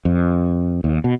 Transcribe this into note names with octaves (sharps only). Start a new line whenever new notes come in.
F2
D#2
B2